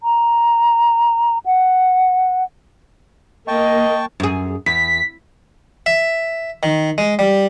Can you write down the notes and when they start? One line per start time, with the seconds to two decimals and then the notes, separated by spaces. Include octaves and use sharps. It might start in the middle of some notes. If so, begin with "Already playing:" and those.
0.03 A#5
1.46 F#5
3.48 A#3 D#5 G5 A5 C#6
4.20 F#2 G#4
4.66 E2 B6
5.86 E5
6.63 D#3
6.98 G#3
7.19 G3